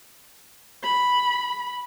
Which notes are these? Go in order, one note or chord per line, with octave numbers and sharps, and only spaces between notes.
B5